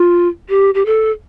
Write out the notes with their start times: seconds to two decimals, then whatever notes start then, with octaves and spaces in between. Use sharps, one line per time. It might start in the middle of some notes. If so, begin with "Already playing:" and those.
Already playing: F4
0.49 G4
0.74 G4
0.86 A4